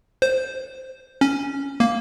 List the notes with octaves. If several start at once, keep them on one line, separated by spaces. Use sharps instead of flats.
C5
C#4
A#3